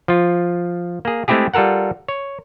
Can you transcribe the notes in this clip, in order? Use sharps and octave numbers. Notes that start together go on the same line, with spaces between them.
F3 F4
A#3 G#4
G#3 A3 C4 E4 G4 G#4
G3 F4 A4 A#4 F#5
C#5